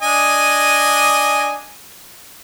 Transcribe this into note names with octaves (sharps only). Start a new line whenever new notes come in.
D4 D#5 G#5